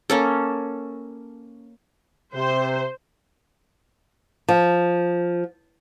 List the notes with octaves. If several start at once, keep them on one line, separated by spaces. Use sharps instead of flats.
A#3 C#4 A4
C3 C5
F3